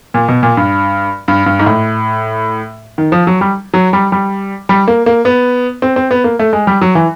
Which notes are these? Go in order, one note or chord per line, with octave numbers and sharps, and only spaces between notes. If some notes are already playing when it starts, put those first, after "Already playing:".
A#2
B2
A#2
G2
G2
G2
G#2
A2
D#3
F3
F#3
G3
F#3
G3
G3
G3
A#3
A#3
B3
C4
C4
B3
A#3
A3
G#3
G3
F#3
E3